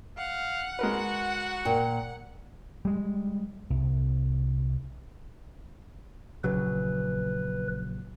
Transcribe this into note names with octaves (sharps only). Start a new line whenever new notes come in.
F5 F#5
G#3 F#4 A#4 B4
A#2 G5
G3 G#3
C2
A#1 C#3 F#3 B4